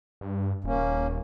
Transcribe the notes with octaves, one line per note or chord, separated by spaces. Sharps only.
G2
D#1 A#3 C#4